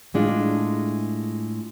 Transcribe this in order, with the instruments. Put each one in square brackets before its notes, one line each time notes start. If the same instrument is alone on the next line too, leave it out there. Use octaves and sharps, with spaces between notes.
[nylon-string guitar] A2 G#3 D4 F4